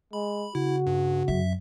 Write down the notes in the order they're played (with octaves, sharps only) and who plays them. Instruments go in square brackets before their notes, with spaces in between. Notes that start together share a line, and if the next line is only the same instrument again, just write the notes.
[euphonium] G#3 [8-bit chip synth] B5
[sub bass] C#3 [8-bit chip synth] E4 [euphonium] F#4
[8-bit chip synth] G2
[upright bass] F#2 [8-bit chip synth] E5